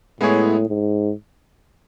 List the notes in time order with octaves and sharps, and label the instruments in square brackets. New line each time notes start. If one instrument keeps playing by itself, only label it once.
[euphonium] A2 [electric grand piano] G#3 B3 E4 G#4 C#5
[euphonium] G#2